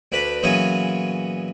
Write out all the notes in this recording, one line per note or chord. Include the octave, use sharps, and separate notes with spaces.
D2 D4 B4 B5
A#2 E3 F#3 B3 C#4 G#4